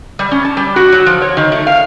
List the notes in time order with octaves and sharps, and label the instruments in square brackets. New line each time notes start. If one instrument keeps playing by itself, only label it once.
[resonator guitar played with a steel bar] G3
C#4
A5
G3
F#4
F#3
F3
C#5
D#3
A3
F5